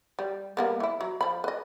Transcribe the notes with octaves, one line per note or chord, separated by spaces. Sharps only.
G3
G3 A#3 B3
E3 E4
F#3
F3 B5
B4 D#5